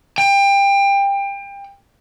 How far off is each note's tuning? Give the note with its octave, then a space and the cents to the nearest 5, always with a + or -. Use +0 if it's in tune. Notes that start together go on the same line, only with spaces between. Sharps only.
G5 +25